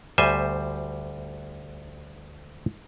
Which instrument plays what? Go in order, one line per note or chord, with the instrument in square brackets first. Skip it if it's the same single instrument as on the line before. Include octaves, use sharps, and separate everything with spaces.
[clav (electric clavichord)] D2 G3 C5 E5 G#5